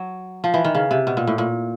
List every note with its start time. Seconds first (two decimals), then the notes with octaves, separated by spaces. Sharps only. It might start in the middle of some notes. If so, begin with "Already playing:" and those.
Already playing: F#3
0.44 F3
0.54 E3
0.65 D#3
0.75 C#3
0.91 C3
1.07 B2
1.17 A#2
1.27 A2
1.38 A#2